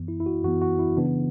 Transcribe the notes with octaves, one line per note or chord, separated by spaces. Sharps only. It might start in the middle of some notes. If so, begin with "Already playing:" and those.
Already playing: F#2 E3 B3
E4
E4
F#4
F#2 E3 B3 F#4
F#4
E4
C#3 E3 B3 D4